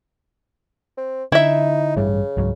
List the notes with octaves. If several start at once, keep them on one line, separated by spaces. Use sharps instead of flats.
C4
D3 D#4 E4 E5
A1 G2 C#3 G3
C#2 G#2 F#3